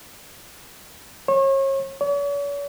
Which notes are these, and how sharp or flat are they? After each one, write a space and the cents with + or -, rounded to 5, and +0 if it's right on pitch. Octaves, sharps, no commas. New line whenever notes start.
C#5 -35
C#5 +45